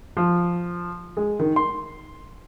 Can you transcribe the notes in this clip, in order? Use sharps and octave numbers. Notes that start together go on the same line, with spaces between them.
F3
G#3
D#3
C6